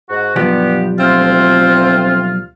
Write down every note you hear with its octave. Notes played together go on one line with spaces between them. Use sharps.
G#2 F#4
B1 G2 F3 G3 B3 G4
D2 C4 F4 F6